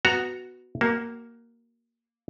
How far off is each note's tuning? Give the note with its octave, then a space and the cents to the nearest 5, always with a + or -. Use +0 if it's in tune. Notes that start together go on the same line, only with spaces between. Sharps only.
B3 +5 F#4 +0 A#5 +0
A#3 +0 F#4 +30